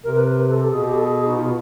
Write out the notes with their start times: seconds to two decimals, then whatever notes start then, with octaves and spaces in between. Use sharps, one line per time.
0.04 C3 A#4
0.16 B4
0.27 A#4
0.37 B4
0.49 A4
0.60 A4
0.71 B2 G#4
0.82 G4
0.93 A4
1.04 G#4
1.15 G#4
1.26 D#4
1.37 F4